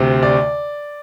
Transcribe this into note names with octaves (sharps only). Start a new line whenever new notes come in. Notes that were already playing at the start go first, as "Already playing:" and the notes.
Already playing: D2 C3
D5